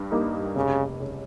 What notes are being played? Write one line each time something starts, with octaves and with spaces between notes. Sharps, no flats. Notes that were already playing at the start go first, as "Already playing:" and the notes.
Already playing: G2
G3 A#3 D#4
F1 C#3
C#3